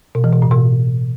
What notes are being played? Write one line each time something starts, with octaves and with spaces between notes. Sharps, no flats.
B2
E3
B2
A2
B2